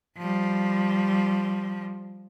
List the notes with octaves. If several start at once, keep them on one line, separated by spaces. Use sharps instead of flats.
F3 G3